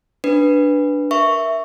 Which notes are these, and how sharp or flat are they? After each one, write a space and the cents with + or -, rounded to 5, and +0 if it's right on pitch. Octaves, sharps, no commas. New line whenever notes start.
D4 +0 B4 +0
A#4 +15 E5 +0 C#6 +0